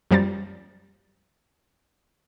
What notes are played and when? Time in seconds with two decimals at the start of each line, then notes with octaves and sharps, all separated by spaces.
0.11 F#2 F3 G3 A#5 A6